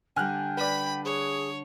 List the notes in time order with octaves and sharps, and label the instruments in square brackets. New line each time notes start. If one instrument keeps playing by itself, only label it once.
[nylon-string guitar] D3 G3 [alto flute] G5 [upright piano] G#5 F6 F#6
[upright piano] B4 D5 [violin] B5 B6
[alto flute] G#4 [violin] C#5